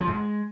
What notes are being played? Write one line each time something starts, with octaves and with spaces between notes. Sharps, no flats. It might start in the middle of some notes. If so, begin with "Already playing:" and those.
F3
G#2
G#3